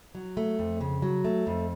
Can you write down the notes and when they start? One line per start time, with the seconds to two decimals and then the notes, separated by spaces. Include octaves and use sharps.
0.15 F#3
0.37 A3
0.59 F2
0.81 C#3
1.02 F#3
1.25 A3
1.47 F2